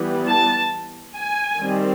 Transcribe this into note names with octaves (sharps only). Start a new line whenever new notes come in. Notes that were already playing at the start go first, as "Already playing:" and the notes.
Already playing: E3 G3 B3
A5
G#5
D#3 G3 C4